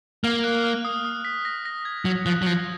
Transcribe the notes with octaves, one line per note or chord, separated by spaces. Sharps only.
A#3 F6
F#6
F6
D#6
D#6
B6
A#6
A#6
G#6
F#3 G#6
F3 F#6
F#3
F3 A#6